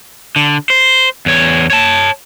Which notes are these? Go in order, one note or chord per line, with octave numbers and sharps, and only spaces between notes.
D3
C5
E2 C#5
C#5 A5